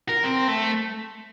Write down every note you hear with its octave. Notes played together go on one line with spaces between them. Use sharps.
A#4
C4
A3